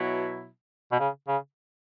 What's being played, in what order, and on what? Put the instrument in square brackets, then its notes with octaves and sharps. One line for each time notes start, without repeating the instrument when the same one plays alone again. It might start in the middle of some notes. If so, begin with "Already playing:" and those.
Already playing: [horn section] B2 F#3 E4
[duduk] B2
C#3
C#3